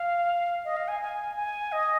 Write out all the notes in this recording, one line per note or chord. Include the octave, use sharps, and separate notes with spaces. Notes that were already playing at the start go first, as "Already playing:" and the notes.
Already playing: F5
D#5
F5
G#5
G#5
G#5
D#5